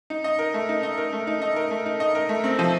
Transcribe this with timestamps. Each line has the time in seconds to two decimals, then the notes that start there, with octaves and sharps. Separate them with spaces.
0.10 D#4
0.24 D#5
0.39 A#4
0.54 A3
0.69 D#4
0.83 D#5
0.98 A#4
1.13 A3
1.27 D#4
1.42 D#5
1.56 A#4
1.71 A3
1.86 D#4
2.00 D#5
2.15 A#4
2.29 A3
2.44 C4
2.59 F3